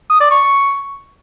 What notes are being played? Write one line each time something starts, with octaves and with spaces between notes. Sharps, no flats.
D#6
D5
C#6